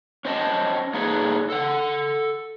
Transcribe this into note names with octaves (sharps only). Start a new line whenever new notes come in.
C#4 C5 D#5 A5
A#3 D#4 G#4 A4 B4 C#5
A4 F#5